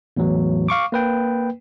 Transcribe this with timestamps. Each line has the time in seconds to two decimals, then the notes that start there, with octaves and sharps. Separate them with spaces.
0.17 E2 A2 E3 F#3
0.68 F5 C#6 D6
0.92 A#3 B4 G5